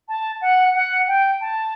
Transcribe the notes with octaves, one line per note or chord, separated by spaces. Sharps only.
A5
F#5
F#5
G5
A5